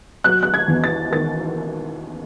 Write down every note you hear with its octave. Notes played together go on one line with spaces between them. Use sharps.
F#3 F#6
F#6
G#6
E2
A6
D#3 A6